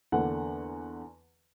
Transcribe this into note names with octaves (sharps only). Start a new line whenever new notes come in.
E2 D3 A#3 F#5